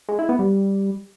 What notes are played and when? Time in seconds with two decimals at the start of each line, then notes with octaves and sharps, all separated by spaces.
0.09 G#3
0.19 E4
0.29 B3
0.39 G3